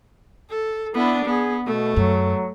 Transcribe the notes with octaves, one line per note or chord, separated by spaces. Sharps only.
A4
B3 D4 E4
B3 G#4
B2 A3
F#2 F#3